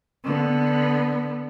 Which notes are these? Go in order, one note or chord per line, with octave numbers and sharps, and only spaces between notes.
D3 B3